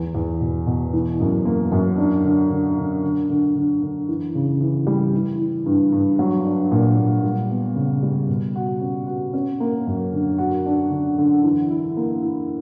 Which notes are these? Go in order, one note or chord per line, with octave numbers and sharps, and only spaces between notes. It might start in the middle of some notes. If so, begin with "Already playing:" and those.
Already playing: E2
E2
B2
B2
E3
F#2
A#3
F#2
D4
D3
D3
D3
D3
D3
D3
D3
E3
C#3
E3
G3
E3
E3
G2
G2
F#3
D4
A#2
A#2
G3
B3
C#3
G3
B2
F#4
C#4
F#4
C#4
A#3
F#2
D3
F#4
D4
D3
D3
E3
E4
A#3
E4